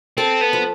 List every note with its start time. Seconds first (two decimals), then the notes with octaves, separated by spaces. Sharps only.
0.17 C4 A4
0.41 B3
0.53 F3